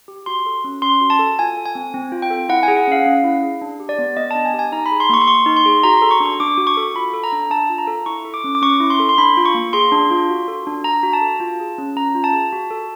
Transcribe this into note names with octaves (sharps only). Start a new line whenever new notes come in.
G4
F#4 C6
A4
C#4
C#4 C6
F#4
A5
A4
F4 G#5
A4
G#5
C4
C4
F4
G5
A4
E4 F#5
G#5
G#4
F#5
C#4 F5
C#4
E4
G#4
D4
G4
D5
B3
B3 D#5
D4 A5
G#5
G4
G#5
D#4 A#5
B5
G#4
C6
A#3 C#6
C6
A#3 C#6
D#4
C6
G#4
F#4 A#5
A4 C6
C#6
D4
C#6
D4 D6
F#4
C#6
A4
F4 B5
A4
A#5
D4
D4 A5
F4
A#5
A4
E4 C#6
A4
D6
C#4
D6
C#4 C#6
E4
C6
A4
C6
D4 B5
F4
C#6
A#3
G#4 C6
D4
F4
F#4
A4
D4
D4 A#5
F#4
A5
A4
F4
G#4
C#4
C#4 A#5
F4
A5
G#4
F#4
A4